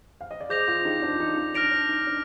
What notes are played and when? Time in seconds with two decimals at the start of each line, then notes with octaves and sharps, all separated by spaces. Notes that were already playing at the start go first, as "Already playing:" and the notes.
0.21 F5
0.31 D#5
0.40 D5
0.49 G#4 C5 D6 G6 A#6 F7
0.68 F4 G#4
0.85 D#4 G4
1.02 D4 F4
1.20 D#4
1.37 D#4
1.54 D4 F6 A#6 D7 F7
1.72 D4
1.89 D#4
2.07 D4